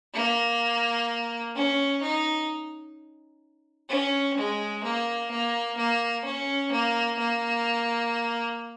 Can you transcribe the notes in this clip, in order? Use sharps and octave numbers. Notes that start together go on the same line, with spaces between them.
A#3
C#4
D#4
C#4
G#3
A#3
A#3
A#3
C#4
A#3
A#3